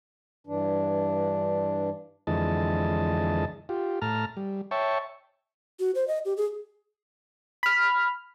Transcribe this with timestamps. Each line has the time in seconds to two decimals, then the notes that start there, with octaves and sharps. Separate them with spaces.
0.47 G2 E3 D4
2.27 F2 D3 E3 G#3 D#5 A5
3.69 F4 G4
4.02 A2 A5 A#5 F6
4.37 G3
4.71 C#5 E5 G5 A5 C#6
5.80 F#4
5.95 C5
6.08 D#5
6.25 G4
6.37 G#4
7.63 B5 F6